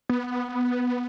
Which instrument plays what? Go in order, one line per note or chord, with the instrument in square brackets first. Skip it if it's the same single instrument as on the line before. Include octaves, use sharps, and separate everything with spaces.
[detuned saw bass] B3